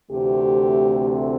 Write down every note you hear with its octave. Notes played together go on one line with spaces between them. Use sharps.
D2 C3 E3 A3 C4 G4